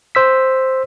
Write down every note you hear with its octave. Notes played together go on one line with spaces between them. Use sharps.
C5 E6 B6